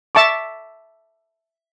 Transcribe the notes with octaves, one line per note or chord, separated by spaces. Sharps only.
E5 A5 C#6 D6